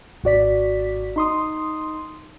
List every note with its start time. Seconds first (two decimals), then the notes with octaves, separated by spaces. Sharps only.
0.24 G#1 F#4 D5 B6
1.16 D#4 C6 D#6